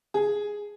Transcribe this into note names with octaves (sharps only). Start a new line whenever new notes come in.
G#4